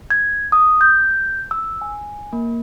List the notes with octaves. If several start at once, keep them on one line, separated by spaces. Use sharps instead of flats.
G#6
D#6
G6
E6
G#5
A#3